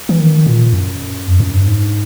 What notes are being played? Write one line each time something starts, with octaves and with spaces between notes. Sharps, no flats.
E3
D#3
A#2
F#2
F2
F#2
G2
G#2